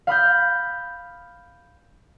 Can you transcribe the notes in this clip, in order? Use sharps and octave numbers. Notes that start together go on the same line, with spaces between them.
F5 B5 D#6 G6